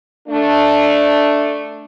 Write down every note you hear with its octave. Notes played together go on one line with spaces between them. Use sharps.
A3 D4